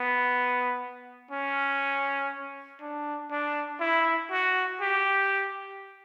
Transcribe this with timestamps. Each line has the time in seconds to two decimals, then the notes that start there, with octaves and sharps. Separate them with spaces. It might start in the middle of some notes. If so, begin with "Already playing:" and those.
Already playing: B3
1.31 C#4
2.81 D4
3.31 D4
3.80 E4
4.31 F#4
4.81 G4